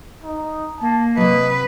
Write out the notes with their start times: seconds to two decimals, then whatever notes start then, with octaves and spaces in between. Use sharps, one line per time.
0.24 D#4
0.81 A#3 A5
1.17 C3 F#3 B4 D#5